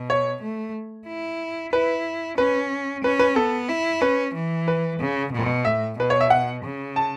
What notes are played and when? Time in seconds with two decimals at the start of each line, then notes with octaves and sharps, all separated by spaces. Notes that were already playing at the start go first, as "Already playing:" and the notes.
Already playing: B2
0.10 C#5
0.42 A3
1.07 E4
1.72 E4 B4
2.38 C#4 B4
3.04 C#4 B4
3.19 B4
3.36 B3 A4
3.68 E4
4.01 C#4 B4
4.34 E3
4.68 B4
5.00 C#3
5.33 B2
5.65 A2 E5
5.98 B2 B4
6.10 C#5
6.20 E5
6.30 F#5
6.64 C#3
6.96 A5